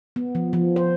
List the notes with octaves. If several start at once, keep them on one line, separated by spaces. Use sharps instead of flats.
B3
F3
F3
C5